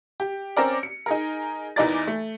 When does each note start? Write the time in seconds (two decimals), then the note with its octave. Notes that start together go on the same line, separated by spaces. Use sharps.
0.20 G4
0.57 C4 C#4 A#4 D5
0.83 C#7
1.06 D#4 G#4 A#4
1.76 E2 E3 D#4 A#4 D5 A6
2.07 A3